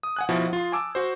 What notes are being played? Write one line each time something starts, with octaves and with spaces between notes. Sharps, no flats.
D#6
F#5 G#5 F#6
B2 F3 E4 F#4
F4 C6
G#5 A5 D6 E6
F#4 C5